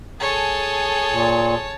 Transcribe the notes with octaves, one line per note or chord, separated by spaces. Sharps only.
G#4 A4 C#5 G#5 A5
A#2